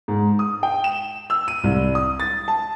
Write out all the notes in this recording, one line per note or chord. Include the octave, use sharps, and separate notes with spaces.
G#2
D#6
G5
E7
E6
D#7
C2
D#6
A6
A5